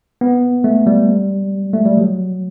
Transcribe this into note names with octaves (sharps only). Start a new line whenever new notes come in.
B3
A3
G3
A3
G3
F#3